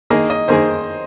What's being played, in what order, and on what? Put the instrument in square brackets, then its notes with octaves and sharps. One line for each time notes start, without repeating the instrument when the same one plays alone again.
[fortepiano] D#3 A#3 G#4 [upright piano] D#5
[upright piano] D#5
[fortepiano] D#3 A#3 G#4 [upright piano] C5